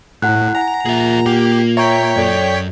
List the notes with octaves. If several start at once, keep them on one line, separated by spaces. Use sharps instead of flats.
A2 E4 F#5 F#6
F#5 G#5 A#5
A#2 G#4 E5
A#3 G4
C#5 E5 G5 A#5 C#6 B6
F#2 A4 D5